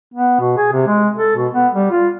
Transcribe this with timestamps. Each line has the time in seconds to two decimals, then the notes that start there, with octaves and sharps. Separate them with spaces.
0.14 B3
0.40 B2
0.57 G#4
0.72 C3
0.87 G#3
1.16 A4
1.36 B2
1.53 B3
1.74 G3
1.91 F4